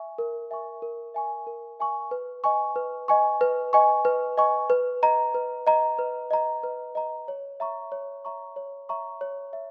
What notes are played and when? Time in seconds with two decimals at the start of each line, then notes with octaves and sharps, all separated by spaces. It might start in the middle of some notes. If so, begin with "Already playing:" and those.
Already playing: E5 G#5 C#6
0.18 A#4
0.51 E5 G#5 C#6
0.82 A#4
1.14 E5 G#5 C#6
1.47 A#4
1.80 E5 G#5 C#6
2.11 B4
2.44 D#5 G#5 C#6
2.76 B4
3.08 D#5 G#5 C#6
3.41 B4
3.73 D#5 G#5 C#6
4.05 B4
4.37 D#5 G#5 C#6
4.70 B4
5.03 D#5 A#5
5.34 B4
5.67 D#5 A#5
5.99 B4
6.31 D#5 A#5
6.63 B4
6.95 D#5 A#5
7.28 C#5
7.60 E5 A#5 C#6
7.92 C#5
8.25 E5 A#5 C#6
8.56 C#5
8.89 E5 A#5 C#6
9.21 C#5
9.53 E5